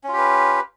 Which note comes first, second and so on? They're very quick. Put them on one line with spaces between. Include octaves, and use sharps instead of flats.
C#4 F4 G4 B4